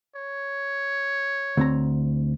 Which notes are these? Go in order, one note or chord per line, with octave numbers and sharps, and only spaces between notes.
C#5
D2 C4 A#5